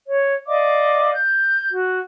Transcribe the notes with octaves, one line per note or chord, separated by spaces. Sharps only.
C#5
D5 D#5 F5 D6
G6
F#4